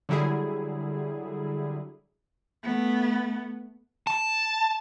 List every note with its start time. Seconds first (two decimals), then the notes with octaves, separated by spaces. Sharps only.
0.09 D3 F#3 G3 E4 G#4
2.63 A3 B3
4.07 A5